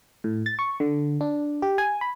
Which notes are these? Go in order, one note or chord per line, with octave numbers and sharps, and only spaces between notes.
A2
A6
C#6
D3
D4
G4
G#5
B5